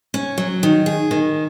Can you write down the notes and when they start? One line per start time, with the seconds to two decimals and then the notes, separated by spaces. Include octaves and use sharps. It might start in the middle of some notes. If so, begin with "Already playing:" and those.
0.14 C#4
0.38 F#3
0.63 D#3
0.86 G#4
1.11 D#3